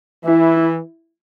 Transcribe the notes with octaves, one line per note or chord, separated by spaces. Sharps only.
E3 E4